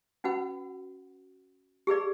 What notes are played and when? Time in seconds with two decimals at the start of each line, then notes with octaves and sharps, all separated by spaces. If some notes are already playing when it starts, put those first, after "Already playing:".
0.24 C#4 F#4 B4 F#5
1.87 G4 G#4 B4 D5